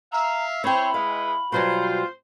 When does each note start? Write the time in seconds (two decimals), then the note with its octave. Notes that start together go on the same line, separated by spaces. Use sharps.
0.12 E5 F5 A#5
0.64 C4 E4 C5 C#5 G5 B5
0.94 G#3 B4 F5
1.52 B2 F#3 G3 F4 C5